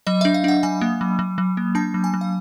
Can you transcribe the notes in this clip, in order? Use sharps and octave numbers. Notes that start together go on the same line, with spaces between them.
F#3 D#5
D4 E5
F5
D4 F#5
F#3 G#5
A#3
F#3
F#3
F#3
A#3
D4 A5
F#3
G#5
F#3
F5